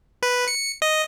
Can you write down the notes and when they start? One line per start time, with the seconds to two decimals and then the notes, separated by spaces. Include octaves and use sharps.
0.23 B4
0.48 C#7
0.82 D#5